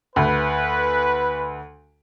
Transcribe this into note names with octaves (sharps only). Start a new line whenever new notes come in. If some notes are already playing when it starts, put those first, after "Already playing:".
D2 B4